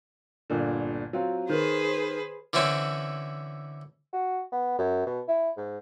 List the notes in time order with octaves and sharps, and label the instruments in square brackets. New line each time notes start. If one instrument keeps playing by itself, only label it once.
[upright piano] G1 A#2 D3
F#3 C4 F4
[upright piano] D#3 [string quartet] G#4 B4 C5
[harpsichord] D3 E3 C4 C#4 E4
[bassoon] F#4
B3
F#2
B2
E4
G#2